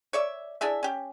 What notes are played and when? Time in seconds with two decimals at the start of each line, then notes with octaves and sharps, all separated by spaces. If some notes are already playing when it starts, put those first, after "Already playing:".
0.13 C#5 D5 E5
0.61 D4 E4 G#4 E5
0.83 C#4 G4